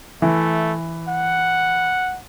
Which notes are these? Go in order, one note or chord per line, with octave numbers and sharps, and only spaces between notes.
E3 A3
F#5